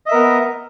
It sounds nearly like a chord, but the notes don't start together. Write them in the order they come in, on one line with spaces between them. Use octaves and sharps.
D#5 E5 A#4 B3